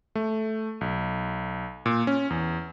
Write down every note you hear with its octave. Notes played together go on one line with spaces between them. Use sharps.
A3
B1
A#2
C#4
E2